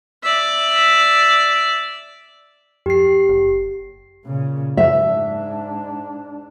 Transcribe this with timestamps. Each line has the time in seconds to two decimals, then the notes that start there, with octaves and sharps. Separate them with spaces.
0.23 D5 E5
2.86 F2 G4 C7
3.29 F#1
4.25 A#2 C#3
4.77 G#2 D4 E5